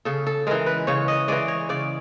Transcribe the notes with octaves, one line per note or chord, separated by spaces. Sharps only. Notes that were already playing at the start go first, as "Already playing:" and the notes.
C#3 A4
A4
E3 G#3 A#4
B4
C#3 C#5
D#5
E3 G#3 D5
C#5
C#3 D5